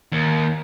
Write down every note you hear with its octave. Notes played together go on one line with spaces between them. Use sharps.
D#2